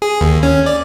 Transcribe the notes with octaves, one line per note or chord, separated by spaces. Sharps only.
G#4
D#2
C#4
D5